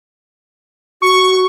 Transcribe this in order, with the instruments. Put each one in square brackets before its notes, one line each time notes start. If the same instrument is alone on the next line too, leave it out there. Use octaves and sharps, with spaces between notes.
[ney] F#4 [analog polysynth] C#6